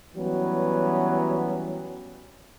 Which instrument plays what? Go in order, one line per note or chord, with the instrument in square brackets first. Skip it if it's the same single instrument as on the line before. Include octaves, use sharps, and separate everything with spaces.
[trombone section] E3 F#3 G3 B3 C#4